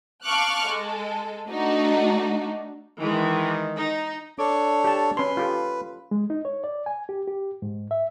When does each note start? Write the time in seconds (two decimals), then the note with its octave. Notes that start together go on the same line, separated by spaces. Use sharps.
0.24 F5 A5 C#6 D6 F6 F#6
0.65 G#3 A4
1.48 A3 D4 D#4 F#4
2.99 D#3 E3 G#3 G#4
3.75 D#4
4.39 D4 A4 C#5 D6
4.84 G4 A5
5.17 C#4 B4 C6
5.37 F4 G4 A4
6.11 G#3
6.30 D#4
6.45 C#5
6.64 D5
6.86 G#5
7.09 G4
7.27 G4
7.62 G#2
7.91 E5